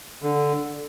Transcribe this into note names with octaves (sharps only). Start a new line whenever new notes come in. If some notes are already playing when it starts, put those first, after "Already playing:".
D3